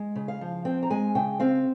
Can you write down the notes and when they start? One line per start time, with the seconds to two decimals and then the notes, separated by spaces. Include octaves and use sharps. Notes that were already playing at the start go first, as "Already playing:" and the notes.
Already playing: G#3
0.16 C#3
0.28 F5
0.41 F3
0.65 C4 G5
0.83 A#5
0.90 G#3 G#5
1.15 C#3 G5
1.40 C4 F5